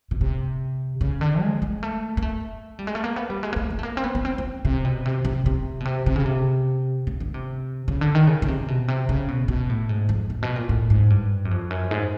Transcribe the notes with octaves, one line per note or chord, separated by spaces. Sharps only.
B2
C3
C#3
D3
G#3
G#3
A3
A#3
A3
G3
G#3
A3
A#3
B3
G3
G#3
A#3
A3
A#3
A3
A#3
C4
B3
B3
C4
C4
C3
B2
C3
C3
C3
B2
C3
C3
C#3
C3
C#3
D3
C3
C#3
D3
D#3
C#3
C#3
C3
B2
C3
C#3
B2
B2
A2
G#2
F2
A2
B2
A#2
A2
G#2
G2
F#2
F2
F#2
G#2